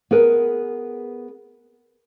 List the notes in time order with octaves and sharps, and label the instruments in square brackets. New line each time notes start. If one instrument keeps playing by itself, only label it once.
[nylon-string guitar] B3 G#4 A#4 B4